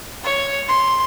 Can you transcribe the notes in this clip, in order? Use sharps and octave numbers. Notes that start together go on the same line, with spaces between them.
C#5
C6